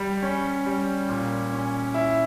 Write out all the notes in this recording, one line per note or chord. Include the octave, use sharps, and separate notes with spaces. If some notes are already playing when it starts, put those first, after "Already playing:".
Already playing: G3
C#4
G3
A#2
C#4
E4